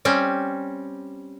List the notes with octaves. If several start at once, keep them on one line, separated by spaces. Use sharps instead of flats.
G3 C4 C#4